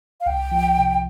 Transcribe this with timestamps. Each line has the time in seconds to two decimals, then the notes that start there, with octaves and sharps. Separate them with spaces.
0.20 F5
0.26 C2 G5
0.51 F3
0.78 C3